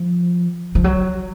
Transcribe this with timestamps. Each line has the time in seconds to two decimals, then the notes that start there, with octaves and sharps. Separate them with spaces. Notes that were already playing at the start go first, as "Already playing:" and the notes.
Already playing: F3
0.75 F3
0.84 F#3